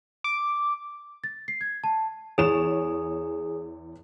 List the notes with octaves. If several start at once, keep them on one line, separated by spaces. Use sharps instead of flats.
D6
A6
C7
G#6
A5
E2 G#4 C#5 E7